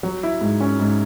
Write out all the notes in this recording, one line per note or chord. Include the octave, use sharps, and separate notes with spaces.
F#3
E4
G#2
C#4
G#2